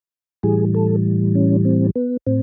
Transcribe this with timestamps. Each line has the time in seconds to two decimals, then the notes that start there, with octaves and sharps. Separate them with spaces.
0.43 A2 E3 G3 G#4
0.75 A4
1.35 C#4
1.65 C4
1.96 B3
2.27 A2 C4